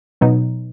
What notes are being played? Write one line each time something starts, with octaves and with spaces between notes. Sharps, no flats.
B2 F#3 B3 D#4